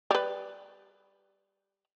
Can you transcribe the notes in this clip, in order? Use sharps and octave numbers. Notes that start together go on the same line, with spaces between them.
G3 B4